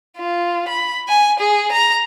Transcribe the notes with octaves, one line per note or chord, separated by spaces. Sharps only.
F4
B5
G#5
G#4
A#5